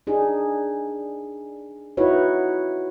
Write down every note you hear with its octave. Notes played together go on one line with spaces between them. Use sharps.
D4 D#4 G#4
D#4 E4 F#4 B4 C#5